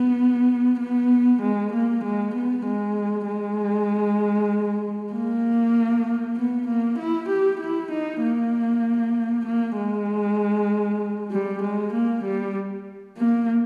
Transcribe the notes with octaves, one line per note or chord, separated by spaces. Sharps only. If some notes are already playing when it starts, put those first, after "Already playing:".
Already playing: B3
B3
G#3
A#3
G#3
B3
G#3
G#3
A#3
B3
A#3
E4
G4
E4
D#4
A#3
A#3
G#3
G3
G#3
A#3
G3
A#3